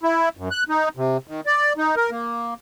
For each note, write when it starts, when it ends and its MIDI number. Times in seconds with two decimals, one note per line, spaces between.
0.03 0.29 64
0.37 0.49 42
0.51 0.63 90
0.69 0.89 63
0.97 1.17 48
1.27 1.41 51
1.46 1.73 74
1.77 1.95 63
1.96 2.10 70
2.11 2.54 58